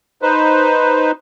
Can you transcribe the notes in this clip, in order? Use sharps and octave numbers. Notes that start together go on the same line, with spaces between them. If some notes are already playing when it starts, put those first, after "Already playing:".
D#4 B4 C5